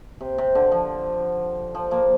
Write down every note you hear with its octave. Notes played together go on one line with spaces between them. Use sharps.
C3
C3
D3
F3
F3
F3 A#3